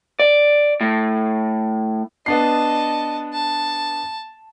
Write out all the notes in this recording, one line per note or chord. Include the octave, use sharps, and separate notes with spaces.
D5
A2
B3 D4 D#5 A5 C7
A5